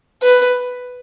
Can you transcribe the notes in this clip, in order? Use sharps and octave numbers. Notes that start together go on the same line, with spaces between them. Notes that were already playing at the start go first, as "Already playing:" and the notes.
B4